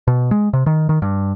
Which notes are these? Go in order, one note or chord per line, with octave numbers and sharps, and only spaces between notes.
B2
G#3
C3
D#3
D#3
G2